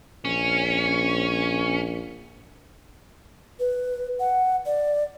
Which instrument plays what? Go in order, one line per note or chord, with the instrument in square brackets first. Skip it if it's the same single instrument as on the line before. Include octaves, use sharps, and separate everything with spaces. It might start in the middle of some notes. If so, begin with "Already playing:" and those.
[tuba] A#1 [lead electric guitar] C#4
[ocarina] B4
F#5
D5